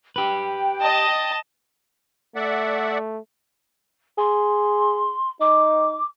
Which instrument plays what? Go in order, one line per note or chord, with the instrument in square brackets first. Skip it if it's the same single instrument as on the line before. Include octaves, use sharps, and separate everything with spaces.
[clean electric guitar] G4 B4 [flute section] G5
[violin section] D#5 A5
[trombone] A3 [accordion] D5 E5 F#5
[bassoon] G#4 [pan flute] C6
[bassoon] D#4 [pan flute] D6